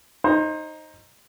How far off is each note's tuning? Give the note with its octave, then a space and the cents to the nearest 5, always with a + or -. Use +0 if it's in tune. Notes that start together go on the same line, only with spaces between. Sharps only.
D#4 +0 C5 +25